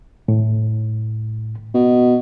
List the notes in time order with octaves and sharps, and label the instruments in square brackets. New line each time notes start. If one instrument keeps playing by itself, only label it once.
[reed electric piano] A2
[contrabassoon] B2